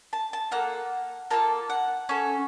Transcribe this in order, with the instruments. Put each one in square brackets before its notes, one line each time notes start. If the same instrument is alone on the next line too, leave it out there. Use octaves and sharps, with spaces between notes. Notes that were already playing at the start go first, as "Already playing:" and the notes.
[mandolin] A5
A5
A#3 F4 A4 F#5
A#3 F4 A4 A5
F#5
C#4 A4